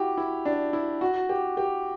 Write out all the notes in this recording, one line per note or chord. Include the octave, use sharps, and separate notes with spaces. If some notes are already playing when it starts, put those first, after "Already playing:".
Already playing: E4 F#4 G4
E4
D4
E4
F#4
G4
G4